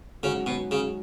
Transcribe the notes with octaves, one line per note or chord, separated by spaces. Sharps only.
G#2 C#3 F#3 C#4 F#4
B2
C#3